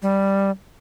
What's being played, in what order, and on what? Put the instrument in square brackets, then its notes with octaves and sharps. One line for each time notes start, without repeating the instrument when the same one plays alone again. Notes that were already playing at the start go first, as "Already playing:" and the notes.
[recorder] G3